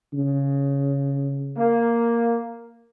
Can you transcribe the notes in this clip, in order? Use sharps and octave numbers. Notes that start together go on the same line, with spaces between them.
C#3
A#3